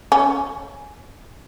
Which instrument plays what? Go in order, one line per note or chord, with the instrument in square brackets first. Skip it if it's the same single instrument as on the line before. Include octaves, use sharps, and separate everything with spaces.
[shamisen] C#4